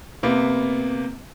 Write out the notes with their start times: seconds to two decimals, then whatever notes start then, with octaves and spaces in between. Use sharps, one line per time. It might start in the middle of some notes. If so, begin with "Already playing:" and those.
0.23 C3 A#3 B3